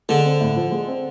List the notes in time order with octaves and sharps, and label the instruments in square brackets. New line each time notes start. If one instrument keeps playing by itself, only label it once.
[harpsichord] D3 [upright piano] G#3
[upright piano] C4
A2
F3
G#3
C4